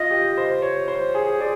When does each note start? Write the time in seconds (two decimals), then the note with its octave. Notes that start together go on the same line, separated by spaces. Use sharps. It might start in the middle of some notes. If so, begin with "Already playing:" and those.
Already playing: F4 D#5
0.11 G4
0.37 C5
0.62 C#5
0.88 C5
1.15 G#4
1.40 G#4 D5